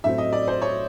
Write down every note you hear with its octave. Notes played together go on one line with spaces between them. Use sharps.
A2 F#3 A3 C4 E5
D#5
D5
C5
C#5